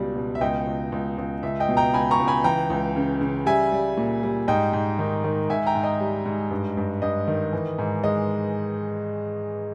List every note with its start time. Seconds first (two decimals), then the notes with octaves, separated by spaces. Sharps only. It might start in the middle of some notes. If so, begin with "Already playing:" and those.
Already playing: C#2 B2 G3
0.16 B2
0.35 E5
0.41 C#2 D#5 G5
0.67 C#2
0.92 C#2
1.18 C#2
1.43 C#2 E5
1.60 D#5 G5
1.69 B2
1.77 G5 A#5
1.94 C#2 G#5 B5
2.11 A#5 C#6
2.19 C#2
2.28 G#5 B5
2.44 E3 G5 A#5
2.70 C#2
2.96 C#3
3.21 C#3
3.46 G3 E5 G#5
3.72 G3
3.97 A#2
4.23 G3
4.48 G#2 D#5 G5
4.73 G#2
4.99 D#3
5.24 D#3
5.49 G#2 E5 G#5
5.67 G5 A#5
5.75 G#2
5.83 D#5 G5
6.01 G3
6.26 G#2
6.51 G2
6.77 G2
7.02 G2 D#5
7.28 D#3
7.53 E3
7.79 G#2
8.03 G#3 D#5